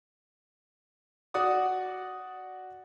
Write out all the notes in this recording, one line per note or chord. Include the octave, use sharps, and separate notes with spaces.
F#4 D5 F#5 D#6